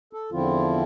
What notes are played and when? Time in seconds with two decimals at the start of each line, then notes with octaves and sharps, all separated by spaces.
0.13 A4
0.32 E2 D3 F3 C4 E4 F4